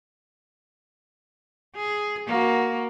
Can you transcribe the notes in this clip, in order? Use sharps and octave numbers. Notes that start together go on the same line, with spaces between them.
G#4
A#3 F#4